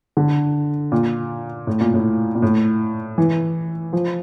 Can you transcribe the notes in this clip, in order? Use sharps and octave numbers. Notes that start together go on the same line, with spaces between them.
D3
A#2
A2
A#2
A2
A#2
A2
E3
F3